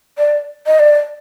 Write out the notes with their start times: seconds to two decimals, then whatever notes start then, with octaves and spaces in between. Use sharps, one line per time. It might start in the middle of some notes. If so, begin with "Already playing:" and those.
0.18 D5
0.66 D#5
0.79 D5